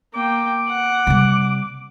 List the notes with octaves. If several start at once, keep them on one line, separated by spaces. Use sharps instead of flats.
A#3 G5 D6
F#5
C3 G3